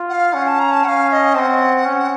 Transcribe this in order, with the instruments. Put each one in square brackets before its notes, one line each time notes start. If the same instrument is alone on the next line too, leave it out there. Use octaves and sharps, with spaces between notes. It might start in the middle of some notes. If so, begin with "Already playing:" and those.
Already playing: [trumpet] F4
[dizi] F#5
F5
[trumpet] C#4 [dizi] F#5
[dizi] A5
A#5
A5
[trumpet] C#4 [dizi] F5 F#5
[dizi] F5
D#5
[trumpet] C4 [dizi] A5
[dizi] F#5
[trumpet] C#4